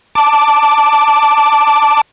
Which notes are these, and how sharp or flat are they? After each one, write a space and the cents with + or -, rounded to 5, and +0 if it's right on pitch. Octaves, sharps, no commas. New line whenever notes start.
A5 +0 D6 +0